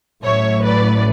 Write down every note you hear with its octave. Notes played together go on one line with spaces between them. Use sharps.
A1 A2 F#3 C#5 E5
B4 D5